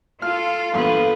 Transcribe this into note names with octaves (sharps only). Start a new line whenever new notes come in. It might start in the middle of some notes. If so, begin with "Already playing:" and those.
F4 A4 F6
E2 G2 A#2 B3 A4 F5